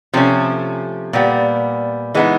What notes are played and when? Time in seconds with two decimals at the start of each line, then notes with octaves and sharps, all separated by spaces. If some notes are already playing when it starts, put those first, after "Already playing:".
0.13 C3 F3 A3 C#4
1.13 A#2 G3 B3
2.15 E3 G#3 B3 D#4